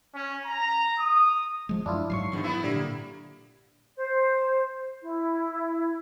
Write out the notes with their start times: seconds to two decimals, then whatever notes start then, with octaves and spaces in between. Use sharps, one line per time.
0.14 C#4
0.45 A#5
0.97 D#6
1.69 F3 G#3
1.86 F#2 D4 E4 F4
2.10 G#2 F#3 C#6 C7
2.32 E2 G2 D#3
2.43 A#3 B3 E4
2.63 A#2 D3 G3 A#3
3.97 C5
5.03 E4